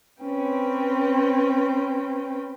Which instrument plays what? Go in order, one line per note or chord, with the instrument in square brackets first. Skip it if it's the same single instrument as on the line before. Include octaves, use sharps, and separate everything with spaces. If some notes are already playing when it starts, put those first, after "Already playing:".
[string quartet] C4 C#4 B4 G5